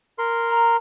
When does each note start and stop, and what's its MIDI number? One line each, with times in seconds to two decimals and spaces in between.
0.18 0.77 70
0.18 0.77 84
0.50 0.76 82